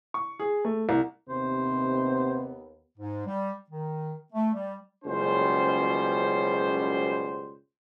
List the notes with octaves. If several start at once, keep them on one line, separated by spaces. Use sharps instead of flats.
C#6
G#4
A3
C2
D#2 C3 B3 C5
G#2
G3
D#3
A3
G3
F#1 C#2 B2 G3 C#4 C5